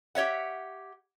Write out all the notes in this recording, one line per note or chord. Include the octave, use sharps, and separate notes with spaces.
G4 C#5 E5 F#5